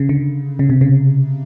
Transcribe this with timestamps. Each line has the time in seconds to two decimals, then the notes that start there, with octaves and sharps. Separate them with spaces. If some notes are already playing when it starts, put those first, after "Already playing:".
Already playing: C#3
0.09 D3
0.59 C#3
0.70 C3
0.81 C#3